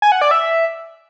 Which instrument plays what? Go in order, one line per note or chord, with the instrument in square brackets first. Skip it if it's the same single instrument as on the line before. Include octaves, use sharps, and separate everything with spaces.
[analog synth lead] G#5
F#5
D5
E5